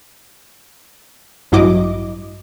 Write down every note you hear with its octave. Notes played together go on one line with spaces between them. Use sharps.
A1 G2 F#3 E4 D#5 D6